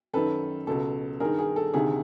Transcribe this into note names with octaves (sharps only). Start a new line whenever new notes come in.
F#2 D#3 A4 B4
C#2 B2 A4
G2 D#3 G#4 A#4
G#4
A4
D2 C3 D#3 G#4